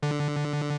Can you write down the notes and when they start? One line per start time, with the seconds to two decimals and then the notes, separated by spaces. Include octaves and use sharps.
0.03 D3